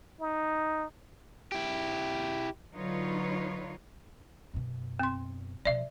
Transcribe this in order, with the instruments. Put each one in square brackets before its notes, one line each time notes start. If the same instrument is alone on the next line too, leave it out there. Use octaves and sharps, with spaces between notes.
[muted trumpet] D#4
[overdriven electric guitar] E4 G4
[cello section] D3 F#3 D#4 F4 B4 C#5
[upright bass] F#2 B2
[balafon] C4 C6
[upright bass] B2 F3 [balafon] D5 E5